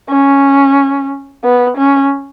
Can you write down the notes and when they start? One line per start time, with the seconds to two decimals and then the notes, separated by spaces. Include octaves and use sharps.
0.10 C#4
1.44 B3
1.77 C#4